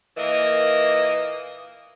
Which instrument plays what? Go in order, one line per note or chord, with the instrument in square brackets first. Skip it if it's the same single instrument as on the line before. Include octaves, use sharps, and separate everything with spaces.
[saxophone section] A#2 E3 A#3 D#5